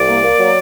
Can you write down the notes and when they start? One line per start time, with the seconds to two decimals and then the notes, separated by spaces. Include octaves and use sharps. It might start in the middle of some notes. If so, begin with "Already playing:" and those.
Already playing: C2 D5
0.09 A#3
0.24 A#3
0.38 F#3